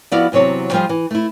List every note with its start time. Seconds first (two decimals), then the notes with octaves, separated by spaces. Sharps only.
0.12 F3 B3 E4 F#4 D5 F5
0.32 E2 C3 F#3 C#5 A5
0.72 F3 G3 F4 G4 G#4 C5
0.89 E3
1.11 A3 E4